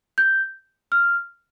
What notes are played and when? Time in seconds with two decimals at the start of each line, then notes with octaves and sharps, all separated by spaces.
0.18 G6
0.92 F6